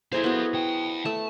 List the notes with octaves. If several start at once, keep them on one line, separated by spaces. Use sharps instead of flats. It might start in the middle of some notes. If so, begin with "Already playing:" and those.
E4 G#4 A4 C5 F5
B3 F#4
F5 G5
A3 A5